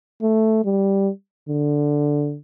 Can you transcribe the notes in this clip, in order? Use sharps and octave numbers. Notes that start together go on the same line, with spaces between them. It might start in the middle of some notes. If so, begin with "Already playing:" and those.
A3
G3
D3